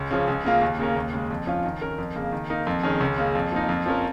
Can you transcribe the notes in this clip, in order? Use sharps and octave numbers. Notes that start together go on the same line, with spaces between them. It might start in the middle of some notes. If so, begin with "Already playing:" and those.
Already playing: C#2
C#3 F3 C#4
C#2
C#3 A#3 F4
D#2
C#3 A#3 C#4 A#4
D#2
C#3 G#3
F2
F3 C#4 F4
D#3
C#4 A#4
F2
C#3 A#3
D#3
A#3 D#4 A#4
F2
D#3 C#4 G#4
C#2
C#3 A#3
F2
F3 A#3 D#4
F2
F3 C#4 A#4